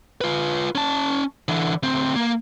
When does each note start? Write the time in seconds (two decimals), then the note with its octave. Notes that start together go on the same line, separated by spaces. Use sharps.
0.21 F4 B4
0.75 C#4 A5
1.48 D3 E3
1.83 D2 C4
2.16 A#3